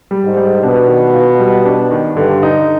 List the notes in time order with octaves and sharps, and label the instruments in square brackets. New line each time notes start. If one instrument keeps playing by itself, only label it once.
[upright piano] G3
[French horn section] G#2
[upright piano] G3
[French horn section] B2 [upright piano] D4
[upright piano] D#3
F4
G3
D4
D#3
[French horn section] G2 [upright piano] D3
[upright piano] D#4